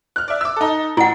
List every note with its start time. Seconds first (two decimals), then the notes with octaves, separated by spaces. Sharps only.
0.16 F6 F#6
0.28 D5 E5
0.41 D6 E6
0.56 D#4 A4
0.97 A1 E4 F#5